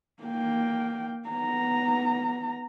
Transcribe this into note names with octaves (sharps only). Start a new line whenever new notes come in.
A#3 G5
B3 A#5